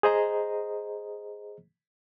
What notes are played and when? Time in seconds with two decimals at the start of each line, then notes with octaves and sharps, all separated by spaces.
0.03 G#4 C5 D#5 A#5